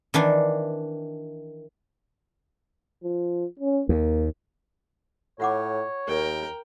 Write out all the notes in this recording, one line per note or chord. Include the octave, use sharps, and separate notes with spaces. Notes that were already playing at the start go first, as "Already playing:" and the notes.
D#3 E3 D4
F3
C#4
D#2 A#3
A2 F4 C#5 F#5 D6
D#2 A#4 G5